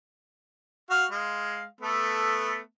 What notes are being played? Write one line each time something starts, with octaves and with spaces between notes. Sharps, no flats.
F#4 F5 F6
G#3 F5
A3 B3 A4